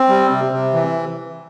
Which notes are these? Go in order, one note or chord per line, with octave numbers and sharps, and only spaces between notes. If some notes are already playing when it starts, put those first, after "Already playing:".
Already playing: C4
G3
C3
C3
E3